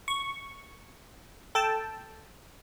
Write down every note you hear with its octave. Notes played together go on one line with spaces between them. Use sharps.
C#6
A4 G5 A5